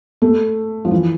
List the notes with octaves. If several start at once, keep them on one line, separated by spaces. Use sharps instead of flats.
A3
F3
E3